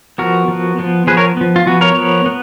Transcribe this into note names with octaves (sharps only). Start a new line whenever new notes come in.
F3 B3 F#4 A#4
F3 B3
F3 B3
F3 B3 G#4 B4
A#4 C#5
F3 B3
F4
F3 B3 F#4
A#4 C#5
F3 B3
B3